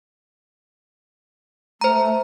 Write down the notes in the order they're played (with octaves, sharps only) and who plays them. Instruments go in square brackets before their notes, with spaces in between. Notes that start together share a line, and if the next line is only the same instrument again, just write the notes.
[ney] A3 [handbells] C5 A#5